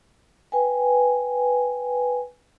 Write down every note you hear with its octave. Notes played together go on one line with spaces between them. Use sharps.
B4 G5 G#5